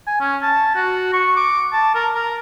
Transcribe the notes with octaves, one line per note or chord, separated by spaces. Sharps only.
G#5
C#4
A5
F#4
C#6
D6
A5
A#4
A#4